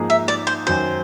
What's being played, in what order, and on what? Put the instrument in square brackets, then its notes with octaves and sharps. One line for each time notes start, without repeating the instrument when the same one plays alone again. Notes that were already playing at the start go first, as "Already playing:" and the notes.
Already playing: [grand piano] G#2 F3 A#3 D#4 G#4
[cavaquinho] E5
D5
C5
[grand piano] F#2 D#3 F#3 [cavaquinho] C5